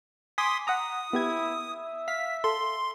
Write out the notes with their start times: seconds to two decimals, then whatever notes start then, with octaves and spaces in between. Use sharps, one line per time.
0.38 G#5 C6 D6 D#6 B6
0.67 F#5 A#5 D#6
1.13 B3 E4 G4 G#6
1.72 E5
2.08 F5 B6
2.44 A4 C6